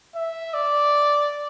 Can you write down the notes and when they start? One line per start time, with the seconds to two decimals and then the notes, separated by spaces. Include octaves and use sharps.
0.15 E5
0.54 D5